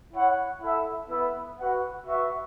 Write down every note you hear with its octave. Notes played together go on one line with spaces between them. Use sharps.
E4 C#5 F#5
E4 A4 E5
B3 E4 B4 E5
F#4 B4 F#5
F#4 B4 E5